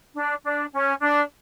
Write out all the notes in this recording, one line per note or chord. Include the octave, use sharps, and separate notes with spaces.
D4
D4
C#4
D4